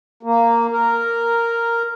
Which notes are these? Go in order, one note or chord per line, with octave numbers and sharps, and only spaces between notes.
A#3
A#4